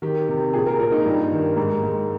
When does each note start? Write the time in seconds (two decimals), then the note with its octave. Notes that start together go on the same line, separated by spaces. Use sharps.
0.02 D#3 G4
0.29 C3
0.54 A#2 G#4
0.66 A#4
0.79 A#2 A#4
0.92 D#4
1.06 G2
1.32 D#3
1.57 G#2
1.83 G#2